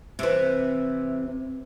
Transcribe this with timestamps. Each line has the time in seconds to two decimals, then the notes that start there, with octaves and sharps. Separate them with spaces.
0.19 C3 E3